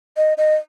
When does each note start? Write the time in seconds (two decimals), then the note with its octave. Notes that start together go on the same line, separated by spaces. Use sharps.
0.17 D#5
0.38 D#5